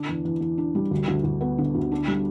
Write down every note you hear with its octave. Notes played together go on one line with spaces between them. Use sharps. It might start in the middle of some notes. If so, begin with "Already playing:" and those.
Already playing: D3 D4
E2
E2
E2
D4
G3
D2
D2
D2
B3
D3
D2
D4
G3